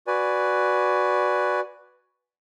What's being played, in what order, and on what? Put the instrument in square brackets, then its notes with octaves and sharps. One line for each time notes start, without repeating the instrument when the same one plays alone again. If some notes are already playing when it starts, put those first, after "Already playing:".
[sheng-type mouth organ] F#4 B4 D5 G#5